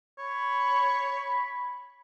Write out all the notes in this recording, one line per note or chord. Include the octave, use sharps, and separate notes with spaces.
C#5 B5